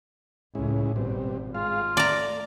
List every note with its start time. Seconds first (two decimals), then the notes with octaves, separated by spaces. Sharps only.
0.55 C#2 A2 G#3 C#4 E4
0.96 G#1 B2 G3 C4
1.55 G#3 F4 F5
1.97 A3 D5 A#5